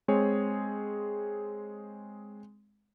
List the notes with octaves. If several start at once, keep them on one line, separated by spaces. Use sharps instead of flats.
G#3 C4 G#4 C#5